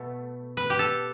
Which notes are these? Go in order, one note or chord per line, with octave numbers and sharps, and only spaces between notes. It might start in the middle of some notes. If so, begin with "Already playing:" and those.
Already playing: B2 A3
B4
G4
A4